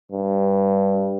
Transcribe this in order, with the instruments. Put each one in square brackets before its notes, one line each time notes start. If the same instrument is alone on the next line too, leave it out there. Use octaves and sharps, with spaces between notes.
[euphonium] G2